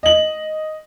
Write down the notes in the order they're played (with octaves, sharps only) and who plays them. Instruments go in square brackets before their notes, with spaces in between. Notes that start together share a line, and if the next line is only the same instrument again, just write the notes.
[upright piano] D#5 F#7